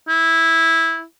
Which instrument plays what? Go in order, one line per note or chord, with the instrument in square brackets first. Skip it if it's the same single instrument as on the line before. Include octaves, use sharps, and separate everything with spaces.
[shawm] E4